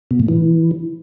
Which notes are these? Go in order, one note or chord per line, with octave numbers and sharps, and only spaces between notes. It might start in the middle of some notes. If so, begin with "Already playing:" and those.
B2
A2
E3